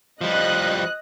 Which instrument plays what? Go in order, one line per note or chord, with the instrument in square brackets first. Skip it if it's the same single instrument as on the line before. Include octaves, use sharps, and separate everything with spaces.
[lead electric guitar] F3 G3 [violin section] D#5 F#6